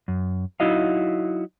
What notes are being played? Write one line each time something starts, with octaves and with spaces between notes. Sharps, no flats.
F#2
F#3 D#4 E4 F#4 D#5 F5